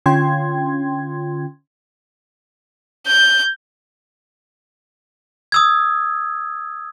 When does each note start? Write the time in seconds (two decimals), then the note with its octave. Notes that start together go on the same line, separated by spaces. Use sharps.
0.06 D3 C#4 F4 G5 C6 G#6
3.07 G6
5.52 D#6 E6 G#6